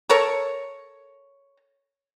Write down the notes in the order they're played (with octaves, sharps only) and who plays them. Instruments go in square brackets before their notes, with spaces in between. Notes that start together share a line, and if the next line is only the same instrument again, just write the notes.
[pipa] A4 A#4 C#5